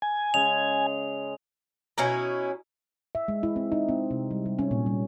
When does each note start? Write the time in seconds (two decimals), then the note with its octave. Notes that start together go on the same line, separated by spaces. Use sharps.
0.02 G#5
0.34 C#3 G#3 G#4 F7
1.98 B2 C#4 E4 A#5
3.15 E5
3.28 G#3
3.43 E4
3.56 C4
3.72 D#4
3.89 C4
4.11 C3
4.31 G3
4.46 G3
4.59 C#4
4.71 A#2
4.86 G3